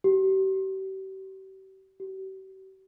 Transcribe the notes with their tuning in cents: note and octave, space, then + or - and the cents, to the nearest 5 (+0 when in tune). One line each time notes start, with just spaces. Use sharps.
G4 -40
G4 -45